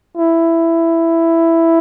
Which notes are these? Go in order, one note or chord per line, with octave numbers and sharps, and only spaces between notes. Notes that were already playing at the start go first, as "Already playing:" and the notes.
E4